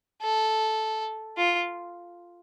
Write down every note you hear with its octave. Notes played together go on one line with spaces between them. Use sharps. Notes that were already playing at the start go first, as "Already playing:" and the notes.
A4
F4